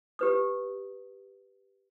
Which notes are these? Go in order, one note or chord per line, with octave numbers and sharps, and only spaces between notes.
G4 B4 D#6